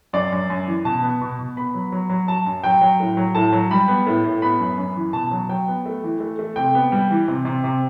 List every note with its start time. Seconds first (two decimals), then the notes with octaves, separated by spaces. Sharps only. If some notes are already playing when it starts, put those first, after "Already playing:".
0.13 F#2 D5
0.32 F#2
0.50 F#2
0.67 E3
0.85 B2 A5
1.03 B3
1.21 B2
1.39 B2
1.56 B3 B5
1.74 F#3
1.92 F#3
2.10 F#3
2.28 F#3 A5
2.46 F#2
2.64 F#3 G5
2.81 F#3
3.00 A2
3.17 F#3
3.35 A2 A5
3.53 F#3
3.71 G3 B5
3.88 B3
4.07 A2
4.24 A2
4.42 B3 B5
4.60 F#2
4.78 F#2
4.96 E3
5.13 B2 A5
5.31 F#3
5.49 F#3 G5
5.68 B3
5.86 A3
6.04 E3
6.20 A3
6.39 A3
6.56 C3 G5
6.75 B3
6.92 G3
7.11 E3
7.28 C3
7.45 C3
7.64 C3